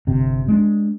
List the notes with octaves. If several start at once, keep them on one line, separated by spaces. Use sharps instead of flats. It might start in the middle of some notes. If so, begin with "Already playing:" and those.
G1 C3
G#3 D4